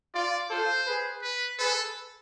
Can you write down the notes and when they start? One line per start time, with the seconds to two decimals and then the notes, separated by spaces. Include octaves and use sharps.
0.14 F4 D5
0.50 F4 A4 C5
0.86 G#4 B4
1.23 B4
1.59 G#4 A4 B4